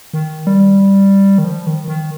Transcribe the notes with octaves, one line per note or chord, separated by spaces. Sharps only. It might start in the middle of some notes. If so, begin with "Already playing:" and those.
D#3
G3
D#3
F3
D#3
D#3